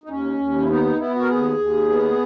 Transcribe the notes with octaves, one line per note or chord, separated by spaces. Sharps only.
D#4
D#2 C#4
D#2
E4
B3 D#4
D#4
B3 E4
F#4
A#4
D#2 G#4
D#2
B3